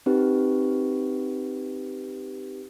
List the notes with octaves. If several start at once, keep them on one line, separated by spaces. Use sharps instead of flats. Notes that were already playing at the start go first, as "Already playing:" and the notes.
C4 D#4 G4 B4